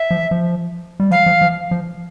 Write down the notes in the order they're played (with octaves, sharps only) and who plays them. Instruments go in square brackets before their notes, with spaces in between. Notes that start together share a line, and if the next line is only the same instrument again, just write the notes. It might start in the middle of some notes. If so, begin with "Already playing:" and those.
Already playing: [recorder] E5
[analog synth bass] F3
F3
G3
[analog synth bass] F3 [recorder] F5
[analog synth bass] F3
F3
F3